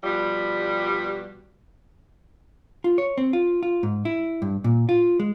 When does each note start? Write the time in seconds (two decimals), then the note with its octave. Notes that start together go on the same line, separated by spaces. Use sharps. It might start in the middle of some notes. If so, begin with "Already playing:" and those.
0.04 B2 F3 G3
2.84 F4
2.98 C#5
3.18 C4
3.33 F4
3.63 F4
3.83 G#2
4.05 E4
4.42 G2
4.64 A#2
4.89 F4
5.20 G#3